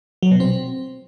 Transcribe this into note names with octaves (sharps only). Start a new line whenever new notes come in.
F#3
B2
C4